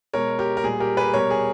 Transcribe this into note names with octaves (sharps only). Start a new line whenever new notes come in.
B2 G#3 A#4 C#5
G4 A#4
A#4
A#2 G3 G#4
G4 A#4
G#4 B4
B2 G3 A#4 C#5
G#4